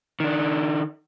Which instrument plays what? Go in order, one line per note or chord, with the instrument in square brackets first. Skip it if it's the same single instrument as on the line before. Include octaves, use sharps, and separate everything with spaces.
[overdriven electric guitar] D#3 D4